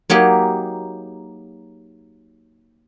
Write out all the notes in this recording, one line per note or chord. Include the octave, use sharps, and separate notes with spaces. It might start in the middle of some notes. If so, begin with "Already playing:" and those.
F#3 A#3 D#4 G4 G#4